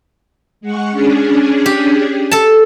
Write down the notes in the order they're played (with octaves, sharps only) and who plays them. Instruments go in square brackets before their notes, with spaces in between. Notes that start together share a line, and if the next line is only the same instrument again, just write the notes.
[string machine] G#3 F#5 C#6
C#4 D4 G#4
[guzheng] G4
A4 A5